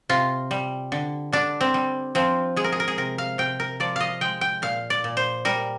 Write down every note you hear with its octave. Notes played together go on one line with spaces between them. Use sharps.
C3 F4
G3
D3
D3 D4
C4
G3
F3 C4
G#3 G#4
A#4
G#4
A#4
G#4
C3 A#4
F5
C3 G5
A#4
F3 D5
D#5 F5
G#3 G5
G5
A#2 F5
D5
A#2
C5
G3 A#4